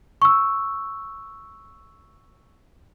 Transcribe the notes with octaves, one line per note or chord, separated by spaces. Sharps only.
C#6 E6